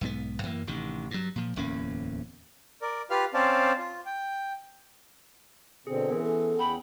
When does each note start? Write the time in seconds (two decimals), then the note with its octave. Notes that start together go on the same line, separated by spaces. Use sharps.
0.01 B1 G#2 F3 B3
0.43 F#2 E3 A#3
0.67 A1 C3 D#3
1.11 G2 F#3
1.36 A#2 F3
1.56 D1 E2 A#3 C#4
2.82 A#4 D5
3.10 F4 G4 B4 F5 F6
3.34 C4 C#4 C5 D5 F5 A5
3.79 F4
4.06 G5
5.87 B2 D3 C4 G#4
6.10 E3 B3 C#4 G#4 A#4
6.23 A4
6.59 E2 F#5 G5 B5